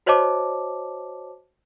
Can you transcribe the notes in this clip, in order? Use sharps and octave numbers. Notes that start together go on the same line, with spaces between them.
F#4 C5 C#5 D#5 A5 D6